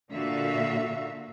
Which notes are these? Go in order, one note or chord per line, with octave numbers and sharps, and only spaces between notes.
A#2 D3 F#4 E5 F5